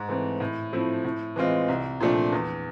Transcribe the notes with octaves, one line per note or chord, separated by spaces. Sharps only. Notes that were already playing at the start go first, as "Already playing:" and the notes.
Already playing: G#2
E3 A3 C4
A2
F3 A3 C4 E4
A2
E3 G#3 C4 F4
C2
A#2 F3 A3 D4
E2